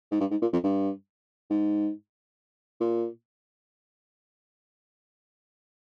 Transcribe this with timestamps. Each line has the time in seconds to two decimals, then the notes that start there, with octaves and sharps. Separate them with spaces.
0.11 G#2
0.20 G2
0.31 G#2
0.42 A#2
0.53 F2
0.63 G2
1.50 G#2
2.81 A#2